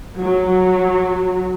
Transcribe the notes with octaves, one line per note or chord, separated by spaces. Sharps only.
F#3